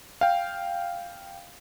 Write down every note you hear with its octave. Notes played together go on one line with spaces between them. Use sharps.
F5 G5